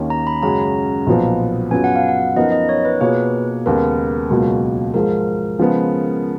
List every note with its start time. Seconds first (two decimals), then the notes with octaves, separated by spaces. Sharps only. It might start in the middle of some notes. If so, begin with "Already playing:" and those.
Already playing: D#2 D#3 A#3 C#4
0.10 A#5
0.27 B5
0.42 F#2 C#3 G#3 C#4 F#4 A#5
1.07 B1 A#2 F3 B3
1.71 F#2 C#3 F#3 B3 F4 G#5
1.84 F#5
1.96 F5
2.08 F#5
2.36 F#2 F3 B3 D#4 A#4 D#5
2.52 D#5
2.69 C#5
2.85 B4
3.01 B2 A#3 F4 G#4 B4 C#5
3.66 D#2 C#3 G#3 B3 A#4
4.30 C#2 B2 F#3 A#3 F4
4.94 G#2 F3 G#3 A#4
5.59 C#3 F3 G#3 B3